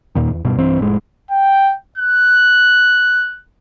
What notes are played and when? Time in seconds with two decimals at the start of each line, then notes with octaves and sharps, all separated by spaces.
0.15 D#2 A#2 D#3
0.30 E2
0.45 D1 G2 B2
0.58 B1 G2 E3 C4
0.79 F1 A2 G#3
1.31 G5
1.98 F#6